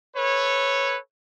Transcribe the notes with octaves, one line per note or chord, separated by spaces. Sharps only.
A4 B4 C#5